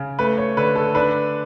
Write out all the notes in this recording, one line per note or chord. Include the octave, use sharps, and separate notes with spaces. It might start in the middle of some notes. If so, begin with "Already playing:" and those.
Already playing: C#3
A3 B4
C#5
D3 B4
A4
D4 B4